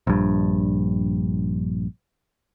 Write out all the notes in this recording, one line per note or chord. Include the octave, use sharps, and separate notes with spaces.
A#1 G2